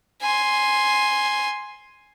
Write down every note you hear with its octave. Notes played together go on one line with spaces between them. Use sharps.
G#5 C6